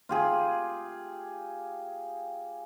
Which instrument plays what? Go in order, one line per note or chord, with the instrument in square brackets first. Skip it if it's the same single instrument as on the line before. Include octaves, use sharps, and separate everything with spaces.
[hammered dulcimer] F4 G4 G#4